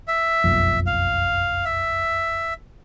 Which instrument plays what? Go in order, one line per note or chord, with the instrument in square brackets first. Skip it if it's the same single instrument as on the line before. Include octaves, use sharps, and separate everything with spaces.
[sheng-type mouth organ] E5
[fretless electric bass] F#1 B1 F2
[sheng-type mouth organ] F5
E5